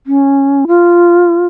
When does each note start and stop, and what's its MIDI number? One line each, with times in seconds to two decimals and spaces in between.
0.07 0.66 61
0.67 1.47 65